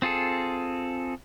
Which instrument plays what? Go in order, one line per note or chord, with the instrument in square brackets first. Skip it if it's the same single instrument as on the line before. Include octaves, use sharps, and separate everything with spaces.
[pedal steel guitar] C4 F4 G#4 A4